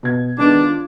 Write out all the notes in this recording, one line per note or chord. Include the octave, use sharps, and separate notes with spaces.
B2 G#6
D#3 G#3 B3 D4
F4